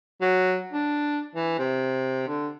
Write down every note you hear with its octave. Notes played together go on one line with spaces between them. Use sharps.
F#3
D4
E3
C3
D3